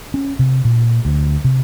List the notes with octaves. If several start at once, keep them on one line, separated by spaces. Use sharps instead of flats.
C#4
C3
A#2
D2
C3